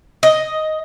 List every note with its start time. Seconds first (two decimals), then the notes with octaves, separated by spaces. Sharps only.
0.23 D#5